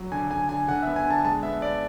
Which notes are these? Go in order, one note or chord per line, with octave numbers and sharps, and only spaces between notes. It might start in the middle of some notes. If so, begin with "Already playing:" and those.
Already playing: F#3
D3 G#5
D3 G#5
D3 G#5
D3 F#5
E5
B3
G#5
D3 A5
G#3 A5
B3 E5
B3 D5